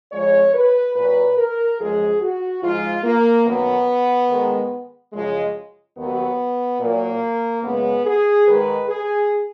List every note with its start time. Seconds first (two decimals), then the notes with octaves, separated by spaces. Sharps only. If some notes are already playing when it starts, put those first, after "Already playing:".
0.12 F2 F3 G#3 C#5
0.54 B4
0.96 A#2 F#3 B4
1.37 A#4
1.79 F#2 F3 G#3 G#4
2.21 F#4
2.63 G#2 F3 G#3 F4
3.04 A#3
3.46 F#2 D#3 F#3 B3
4.30 G#2 D#3 G#3
5.13 F#2 C#3 F3 G#3
5.96 D#2 D#3 F#3 B3
6.80 A#2 F#3 A#3
7.63 F#2 C#3 G#3 B3
8.05 G#4
8.46 G#2 D#3 G#3 B4
8.88 G#4